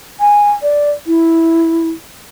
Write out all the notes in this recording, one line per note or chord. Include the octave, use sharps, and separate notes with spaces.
G#5
D5
E4